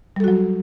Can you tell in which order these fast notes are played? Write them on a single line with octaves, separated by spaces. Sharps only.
G3 A4 F#4 F#3